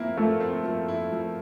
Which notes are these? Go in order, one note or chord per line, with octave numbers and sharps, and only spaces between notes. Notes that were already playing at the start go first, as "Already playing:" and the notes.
Already playing: F3 A#3 C4 E4
F3 A3
C4
F3
E4
F3